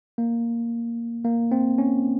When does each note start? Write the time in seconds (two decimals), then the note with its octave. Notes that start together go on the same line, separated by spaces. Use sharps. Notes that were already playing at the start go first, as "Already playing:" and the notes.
0.18 A#3
1.25 A#3
1.51 C4
1.78 C#4